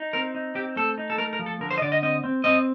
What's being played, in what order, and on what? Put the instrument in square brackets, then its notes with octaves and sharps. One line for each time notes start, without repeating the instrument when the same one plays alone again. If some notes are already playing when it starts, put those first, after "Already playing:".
Already playing: [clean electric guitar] D#4
C4 A#4
D#4
C4 G4
A3 A4
D#4
A4
A3 A#4
A#4
F3
A4
D3 A#4
C5
D#5
D3 D5
D#5
C4 D#5
C4
C4 D#5